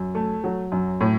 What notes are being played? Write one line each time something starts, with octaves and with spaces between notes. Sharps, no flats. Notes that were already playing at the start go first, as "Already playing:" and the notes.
Already playing: F#2
A3
F#3
F#2
A2